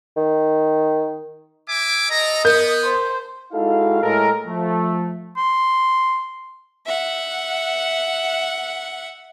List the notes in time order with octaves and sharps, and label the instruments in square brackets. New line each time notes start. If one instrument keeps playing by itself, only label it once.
[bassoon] D#3
[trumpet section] E5 G#5 D6
[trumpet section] A4 A#5 [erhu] D#5
[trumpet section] B3 [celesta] A#4 [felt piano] G6
[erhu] C5
[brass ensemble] G#3 D#4 E4 F#4 A4 F5
A2 G#3 A4 A#4
F3 A3
[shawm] C6
[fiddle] E5 F#5